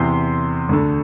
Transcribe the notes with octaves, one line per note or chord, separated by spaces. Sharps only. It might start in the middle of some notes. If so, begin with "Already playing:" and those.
Already playing: E2 C3 E3 C6
D2 D3